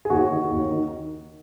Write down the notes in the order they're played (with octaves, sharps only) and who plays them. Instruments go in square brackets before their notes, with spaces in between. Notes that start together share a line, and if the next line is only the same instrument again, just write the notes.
[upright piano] G#4
D#2 F#4
D#3
D#2
D#3